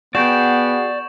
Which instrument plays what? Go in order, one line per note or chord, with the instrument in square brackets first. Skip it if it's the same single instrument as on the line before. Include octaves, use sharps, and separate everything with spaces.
[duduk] B3 [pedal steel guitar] F#4 G#4 G5 [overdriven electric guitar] D5 [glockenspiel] C#6 G6 E7